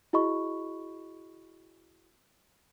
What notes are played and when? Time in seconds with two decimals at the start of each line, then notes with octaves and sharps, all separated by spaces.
0.13 E4 F#4 G#4 D#5 B5 C#6